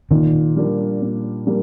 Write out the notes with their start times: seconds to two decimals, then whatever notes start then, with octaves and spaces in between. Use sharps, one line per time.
0.11 A#2 D#3
0.56 G3 A#3 D4
1.02 A#2
1.46 G3 A#3 D4